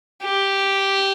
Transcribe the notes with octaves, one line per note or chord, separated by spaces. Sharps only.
G4